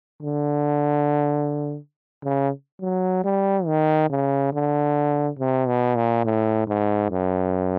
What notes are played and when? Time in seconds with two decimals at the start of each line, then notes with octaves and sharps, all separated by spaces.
0.23 D3
2.24 C#3
2.81 F#3
3.24 G3
3.66 D#3
4.10 C#3
4.53 D3
5.39 C3
5.68 B2
5.96 A#2
6.25 A2
6.68 G#2
7.11 F#2